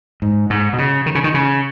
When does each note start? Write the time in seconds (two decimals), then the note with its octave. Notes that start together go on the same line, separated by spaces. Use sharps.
0.22 G#2
0.50 G#2
0.73 B2
0.78 C#3
1.06 D#3
1.15 C#3
1.24 D#3
1.34 C#3